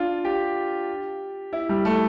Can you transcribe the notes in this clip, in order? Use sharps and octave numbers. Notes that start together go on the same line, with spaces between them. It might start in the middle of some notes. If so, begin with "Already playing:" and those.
Already playing: D4 F4
G4
E4
G3
A3